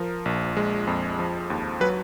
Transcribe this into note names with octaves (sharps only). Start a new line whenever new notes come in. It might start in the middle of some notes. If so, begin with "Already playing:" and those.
Already playing: F3 A#4
A#1
G#3
F2
F3
D#2
F#3 B4